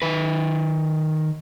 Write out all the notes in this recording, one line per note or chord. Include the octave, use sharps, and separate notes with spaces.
D#3 B4